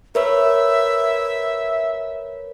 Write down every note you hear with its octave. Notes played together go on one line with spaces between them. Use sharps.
A#4 B4 C#5 E5